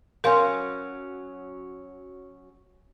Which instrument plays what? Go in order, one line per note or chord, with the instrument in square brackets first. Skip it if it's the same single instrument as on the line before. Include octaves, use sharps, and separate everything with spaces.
[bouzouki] F#3 C#4 [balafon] A#4 F5 C6